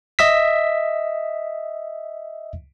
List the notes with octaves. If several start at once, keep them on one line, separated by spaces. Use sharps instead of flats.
D#5 E5 E6 B6